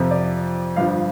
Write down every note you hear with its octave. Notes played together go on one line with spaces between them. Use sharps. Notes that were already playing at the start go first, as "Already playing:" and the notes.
Already playing: F2 C3 F3
D5
G1 G2 F3 F5